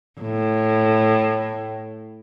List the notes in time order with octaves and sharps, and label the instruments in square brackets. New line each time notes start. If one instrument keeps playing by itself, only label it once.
[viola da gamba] A2